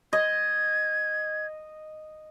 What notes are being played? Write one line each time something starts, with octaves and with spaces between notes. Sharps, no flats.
D#5 G#6